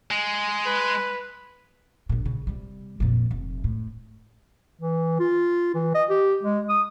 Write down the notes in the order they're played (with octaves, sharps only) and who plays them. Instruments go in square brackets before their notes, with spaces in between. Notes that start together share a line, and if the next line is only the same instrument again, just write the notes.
[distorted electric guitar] G#3
[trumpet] B4
[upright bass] A#1 A#2
C#3
C3 G3
F2 A#2
F1
A2
[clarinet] E3
F4
E3
D#5
G4
G#3
D#6